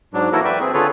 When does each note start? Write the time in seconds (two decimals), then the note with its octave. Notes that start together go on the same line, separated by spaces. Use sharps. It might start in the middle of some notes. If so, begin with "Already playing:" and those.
0.14 G#2 F#3 D4
0.32 E3 A#3 E4 F#4 A4 A#4
0.44 B4 D5 E5 G5
0.60 C4 G#4
0.74 D3 F4 G#4 A4 B4 C#5